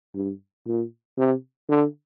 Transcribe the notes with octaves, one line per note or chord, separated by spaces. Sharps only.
G2
A#2
C3
D3